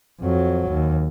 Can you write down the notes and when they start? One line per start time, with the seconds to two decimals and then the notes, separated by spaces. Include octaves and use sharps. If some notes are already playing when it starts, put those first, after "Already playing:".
0.21 F2 F#3
0.71 D#2